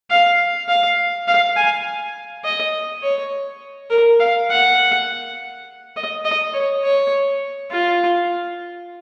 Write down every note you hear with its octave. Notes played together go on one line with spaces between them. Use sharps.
F5
F5
F5
G#5
D#5
C#5
A#4
F5
F#5
D#5
D#5
C#5
C#5
F4